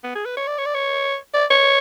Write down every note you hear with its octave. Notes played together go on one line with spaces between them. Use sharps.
B3
G#4
B4
C#5
D5
C#5
D5
C#5
D5
C#5